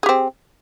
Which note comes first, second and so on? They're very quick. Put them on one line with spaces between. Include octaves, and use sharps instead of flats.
G#4 G4 C4